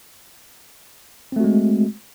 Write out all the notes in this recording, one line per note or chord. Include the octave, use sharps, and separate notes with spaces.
G#3 A3 C4 F#4